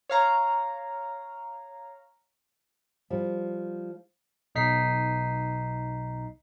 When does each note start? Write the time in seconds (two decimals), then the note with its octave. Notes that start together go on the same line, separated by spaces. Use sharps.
0.10 C#5 F5 A#5
3.10 F3 G3
4.55 B1 D#4 B6 C7